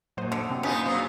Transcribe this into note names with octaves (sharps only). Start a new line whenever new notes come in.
F#2 A#2 F#3 A#3 C5 D#5
D3
C3 C4
C#3 A#3 B3 D4 D#4 F4 F#4
A#2 F#3 F4 C5